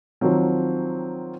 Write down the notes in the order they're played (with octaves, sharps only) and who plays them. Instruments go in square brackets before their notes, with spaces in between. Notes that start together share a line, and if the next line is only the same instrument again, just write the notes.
[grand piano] D#3 F3 F#3 C4